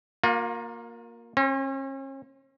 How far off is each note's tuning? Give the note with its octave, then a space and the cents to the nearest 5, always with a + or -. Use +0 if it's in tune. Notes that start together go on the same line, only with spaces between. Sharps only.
A#3 +0 F4 +40
C#4 -40 C5 +20